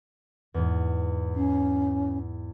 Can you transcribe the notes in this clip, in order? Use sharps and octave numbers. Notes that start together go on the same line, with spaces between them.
E2 G#2
C#4 C7